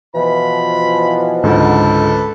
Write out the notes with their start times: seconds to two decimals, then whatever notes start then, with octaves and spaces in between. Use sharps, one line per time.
0.15 B2 E3 F3 B5
1.43 C#2 G#2 D3 A4 B4